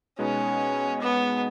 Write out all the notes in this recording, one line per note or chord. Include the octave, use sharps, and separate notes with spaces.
B2 G#3 B3 C#4 D#4
B3